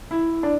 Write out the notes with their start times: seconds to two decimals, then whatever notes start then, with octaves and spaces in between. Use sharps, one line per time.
0.11 E4
0.43 D4